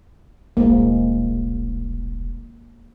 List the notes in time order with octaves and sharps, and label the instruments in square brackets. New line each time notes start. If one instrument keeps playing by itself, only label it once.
[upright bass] D#1 B1 [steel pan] G#3 A#3